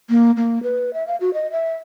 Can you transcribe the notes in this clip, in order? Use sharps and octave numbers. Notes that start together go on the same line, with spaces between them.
A#3
A#3
B4
E5
F5
F#4
D#5
E5